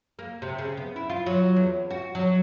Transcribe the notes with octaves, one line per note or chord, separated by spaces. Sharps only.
A#3
C3
C#3
B3
E4
F4
F#3
E2
F#4
F#3